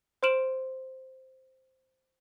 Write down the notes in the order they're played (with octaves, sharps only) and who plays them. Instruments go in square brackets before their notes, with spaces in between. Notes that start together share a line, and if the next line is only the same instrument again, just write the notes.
[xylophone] C5 C6 F6 D7 E7 F#7